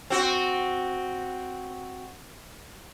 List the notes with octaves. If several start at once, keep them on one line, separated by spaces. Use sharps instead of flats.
C4 F#4